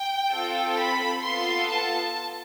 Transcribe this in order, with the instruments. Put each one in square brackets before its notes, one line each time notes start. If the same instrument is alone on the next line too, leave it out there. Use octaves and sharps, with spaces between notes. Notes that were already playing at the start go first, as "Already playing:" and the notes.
Already playing: [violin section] G5
C4 F4 A4
B5
B3 F4 A4 C6
A5